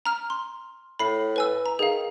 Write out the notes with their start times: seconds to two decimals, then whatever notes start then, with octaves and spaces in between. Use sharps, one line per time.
0.06 A#5 F6
0.30 C6
0.99 A2 B5 C7
1.36 B4 G#5 E6
1.66 A#5
1.79 D#3 G#4 F5